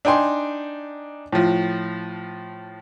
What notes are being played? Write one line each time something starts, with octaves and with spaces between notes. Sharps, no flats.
D4 D#4 G5 G#5 C6
A2 F3